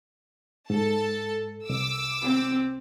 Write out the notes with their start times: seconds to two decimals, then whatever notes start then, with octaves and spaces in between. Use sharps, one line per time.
0.70 G#2 A4 A5
1.69 C2 D6 E6
2.23 C4